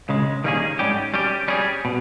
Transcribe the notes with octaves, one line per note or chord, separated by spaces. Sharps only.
C#2 C#3 G#3
D#3 G3 A#3 C#4 G#4
G#2 G3 C#4 G4
G3 C#4 G4
G3 C#4 G#4
B2